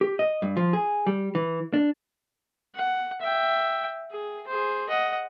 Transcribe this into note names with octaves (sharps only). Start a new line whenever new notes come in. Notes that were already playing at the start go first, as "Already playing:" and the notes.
G4
D#5
G2
F3
G#4
G3
E3
D4
F#5
E5 G5
G#4
G#4 C5
D#5 F#5